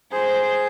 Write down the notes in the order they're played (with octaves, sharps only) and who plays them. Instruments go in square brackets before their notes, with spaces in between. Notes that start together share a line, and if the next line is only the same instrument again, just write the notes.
[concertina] G#4 [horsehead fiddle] C5